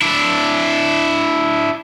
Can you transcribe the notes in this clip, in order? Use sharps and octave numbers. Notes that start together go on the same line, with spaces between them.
D4 E4